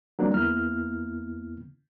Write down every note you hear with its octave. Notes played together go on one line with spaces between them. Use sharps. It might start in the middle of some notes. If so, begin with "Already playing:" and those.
F#3 G3 A#3 C4 D4
E2 A#3 B3 E4 F6